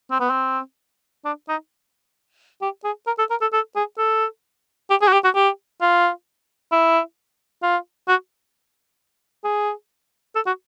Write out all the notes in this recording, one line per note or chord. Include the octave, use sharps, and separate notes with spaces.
C4
B3
C4
D4
D#4
G4
G#4
A#4
A4
A#4
A4
A4
G#4
A4
G4
G#4
F#4
G4
F#4
G4
F4
E4
F4
F#4
G#4
A4
F#4